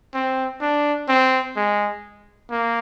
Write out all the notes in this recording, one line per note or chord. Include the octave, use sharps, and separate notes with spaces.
C4
D4
C4
G#3
A#3